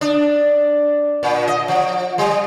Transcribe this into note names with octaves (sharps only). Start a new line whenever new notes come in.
D4
A#2
D#5
F3
G3